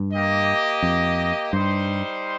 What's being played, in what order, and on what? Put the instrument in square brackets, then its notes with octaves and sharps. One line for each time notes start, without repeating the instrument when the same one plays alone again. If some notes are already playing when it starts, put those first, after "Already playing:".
Already playing: [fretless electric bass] G2
[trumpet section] A#3 G4 D#5
[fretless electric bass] F2
[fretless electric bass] G2 [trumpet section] G3 D#4 C5